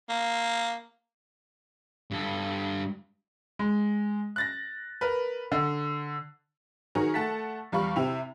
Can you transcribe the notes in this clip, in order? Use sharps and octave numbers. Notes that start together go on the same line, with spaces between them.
A#3
G2 A4
G#3
F#6 A6 A#6
A#4 B4
D3
D#3 D#4 F#4 G#4 A#4 C#5
A3 F#5 A5 A6 B6
E2 G3 F4 F5 B5 C#6
C3 C4 E4 G4 F7